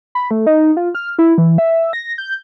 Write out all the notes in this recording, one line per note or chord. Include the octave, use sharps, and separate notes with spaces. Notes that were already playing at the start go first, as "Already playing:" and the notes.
B5
A3
D#4
F4
F6
E4
E3
E5
A#6
G6